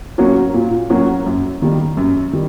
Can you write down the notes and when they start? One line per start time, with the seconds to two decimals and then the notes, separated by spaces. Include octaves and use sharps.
0.18 F#3 A#3 C#4 F#4
0.54 A#2
0.90 F#3 A#3 C#4 F#4
1.26 F#2
1.62 D#3 G3 A#3
1.97 F#2
2.33 D#3 G3